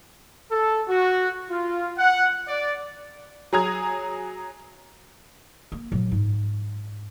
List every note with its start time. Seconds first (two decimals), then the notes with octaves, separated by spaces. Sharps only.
0.52 A4
0.89 F#4
1.50 F4
1.98 F#5
2.48 D5
3.53 F#3 G#4 A#5 D#6 G#6
5.72 A#3
5.92 A#2 F#3
6.12 G#2